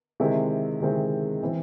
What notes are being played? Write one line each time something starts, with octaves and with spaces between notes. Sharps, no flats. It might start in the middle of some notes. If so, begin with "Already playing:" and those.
C3 D#3 G#3 C4 E4
C3 D#3 G#3 C4 E4
E3 C4